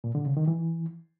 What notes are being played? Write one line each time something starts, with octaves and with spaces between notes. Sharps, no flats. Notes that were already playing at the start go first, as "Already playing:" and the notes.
A#2
D3
C#3
D#3
E3